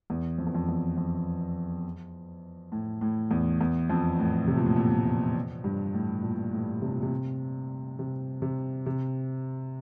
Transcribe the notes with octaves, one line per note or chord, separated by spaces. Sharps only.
E2
F2
E2
F2
E2
F2
A2
A2
E2
E2
F2
A2
C3
A#2
A2
A#2
A2
G2
A2
A#2
A2
C3
A#2
C3
C3
C3
C3